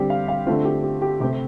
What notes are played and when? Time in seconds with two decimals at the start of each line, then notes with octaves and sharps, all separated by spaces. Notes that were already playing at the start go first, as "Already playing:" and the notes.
Already playing: D3 G3 C4 G4
0.10 F5
0.28 F5
0.47 D3 A3 C4 F4
0.65 G4
0.83 G4
1.02 G4
1.20 C3 A3 C4 G4